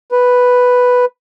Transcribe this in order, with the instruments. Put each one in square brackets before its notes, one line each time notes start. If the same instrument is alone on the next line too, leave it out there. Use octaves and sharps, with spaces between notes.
[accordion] B4